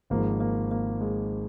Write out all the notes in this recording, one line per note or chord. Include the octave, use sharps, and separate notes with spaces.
G#1 G#2 F3 G#3 A#3
A#3
A#3
G#3